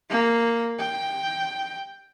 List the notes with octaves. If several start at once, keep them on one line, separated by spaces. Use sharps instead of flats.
A#3
G5